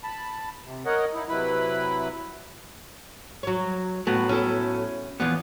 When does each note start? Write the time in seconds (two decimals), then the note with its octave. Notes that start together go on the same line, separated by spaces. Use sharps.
0.03 A5 B5
0.65 C3
0.86 A#4 C#5 D#5 F#5
1.14 D#4 E4
1.29 C3 F#3 E4 B4 B5
3.43 F#3 C#5
4.07 A2 F#3 B3
4.29 C#4 E4 A4
5.20 E2 F3 B3